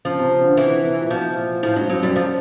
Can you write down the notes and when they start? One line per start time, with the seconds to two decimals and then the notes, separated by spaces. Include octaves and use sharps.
0.05 C#3 F3
0.18 C3
0.31 C#3
0.44 D3
0.57 D3 E3
0.84 C3
1.01 A#2
1.10 B2 F3
1.37 A#2
1.63 A2 F3
1.76 G#2 F#3
1.89 F#2 F#3
2.02 F#2 G3
2.16 F3